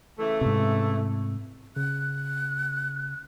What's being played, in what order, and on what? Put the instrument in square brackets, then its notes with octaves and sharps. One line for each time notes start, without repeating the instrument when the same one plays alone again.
[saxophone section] C#3 E3 A3
[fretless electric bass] G#2 C3
[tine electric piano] C#3 [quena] F#6